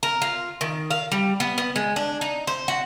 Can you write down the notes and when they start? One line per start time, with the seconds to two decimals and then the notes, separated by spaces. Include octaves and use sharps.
0.03 A#4
0.22 F4
0.61 D#3
0.91 F5
1.12 G3
1.40 B3
1.58 B3
1.76 G#3
1.96 D4
2.21 D#4
2.47 C5
2.68 F#4